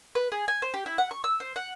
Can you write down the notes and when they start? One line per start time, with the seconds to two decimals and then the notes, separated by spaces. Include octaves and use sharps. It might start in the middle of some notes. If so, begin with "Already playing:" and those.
0.15 B4
0.32 G#4
0.48 G#5
0.62 C5
0.74 G4
0.86 E4
0.98 F#5
1.11 C#6
1.24 E6
1.40 C5
1.56 F#5